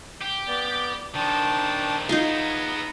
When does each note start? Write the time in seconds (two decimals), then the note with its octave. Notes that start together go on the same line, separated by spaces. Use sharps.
0.21 G4
0.48 B3 D5
1.15 D#3 F3 D4 G5 A5
2.09 B3 D#4 F4 G#4 F5 A#5